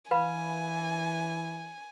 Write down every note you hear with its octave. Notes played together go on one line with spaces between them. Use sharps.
E3 B4 F5 G#5 B5